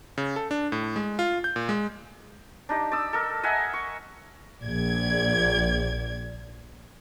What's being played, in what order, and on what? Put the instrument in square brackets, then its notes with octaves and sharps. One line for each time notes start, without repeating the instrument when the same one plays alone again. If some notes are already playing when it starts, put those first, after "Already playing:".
[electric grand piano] C#3
A4
D4
A2
G#3
F4
G6
A#2
G#3
[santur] D4 D#4 G4
D5 D#6 E6
A4 A#4
D#5 E5 F#5 G#5
C#6
[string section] A#1 D5 G#6